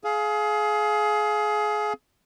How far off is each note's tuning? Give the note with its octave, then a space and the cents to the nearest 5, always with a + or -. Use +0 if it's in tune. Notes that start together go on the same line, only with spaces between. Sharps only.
G#4 +25 F5 +0